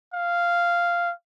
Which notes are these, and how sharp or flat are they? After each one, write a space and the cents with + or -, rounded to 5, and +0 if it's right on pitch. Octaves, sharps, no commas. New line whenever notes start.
F5 -10